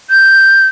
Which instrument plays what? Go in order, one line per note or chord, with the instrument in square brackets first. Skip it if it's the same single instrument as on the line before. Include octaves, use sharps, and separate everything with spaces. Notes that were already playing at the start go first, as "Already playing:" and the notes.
[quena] G6